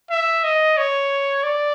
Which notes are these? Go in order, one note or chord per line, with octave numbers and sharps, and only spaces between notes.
E5
D#5
C#5
D5